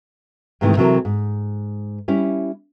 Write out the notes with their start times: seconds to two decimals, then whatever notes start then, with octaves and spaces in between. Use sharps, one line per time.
0.61 G#2 C3 D#3 E3 A3
0.77 C3 E3 F#3 C4 A4 A#4
1.05 G#2
2.08 G3 C#4 E4